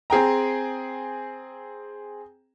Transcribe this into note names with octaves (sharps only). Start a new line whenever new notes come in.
C4 G#4 G5 A#5